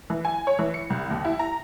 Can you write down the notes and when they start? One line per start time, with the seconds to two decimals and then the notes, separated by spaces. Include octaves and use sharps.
0.10 E3
0.25 G#5
0.47 C#5
0.59 E3
0.74 C#7
0.90 C2
1.11 D#2
1.25 E4
1.39 A#5